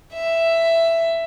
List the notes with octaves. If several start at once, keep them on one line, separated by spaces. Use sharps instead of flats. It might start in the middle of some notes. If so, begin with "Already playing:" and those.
E5